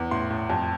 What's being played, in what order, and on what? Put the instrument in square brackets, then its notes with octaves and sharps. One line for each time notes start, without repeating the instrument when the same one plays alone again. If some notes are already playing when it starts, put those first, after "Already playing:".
Already playing: [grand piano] E2
A2 C6
A2
F2